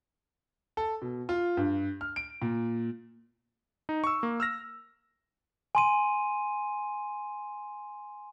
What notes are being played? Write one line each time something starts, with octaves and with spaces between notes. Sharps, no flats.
A4
B2
F4
G2
F6
D7
A#2
D#4
C#6 E6
A#3
E6 F6 A#6
G#5 C6 D#7